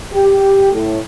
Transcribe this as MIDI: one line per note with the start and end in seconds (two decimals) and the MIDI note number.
0.12 0.67 67
0.71 0.97 45